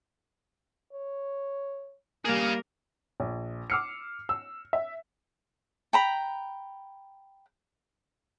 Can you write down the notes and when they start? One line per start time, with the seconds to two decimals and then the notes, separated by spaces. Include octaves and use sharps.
0.93 C#5
2.25 G3 A#3 G#4 A#4 F5
3.20 A#1
3.70 D6 E6 F6 C7 C#7
4.29 E6
4.73 E5
5.93 G5 A#5 B5